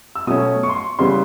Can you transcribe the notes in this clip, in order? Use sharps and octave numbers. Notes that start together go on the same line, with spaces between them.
E6
B2 F#3 A3 C#4 D#6
C#6
C6
C#6
C#3 E3 G3 B3 C6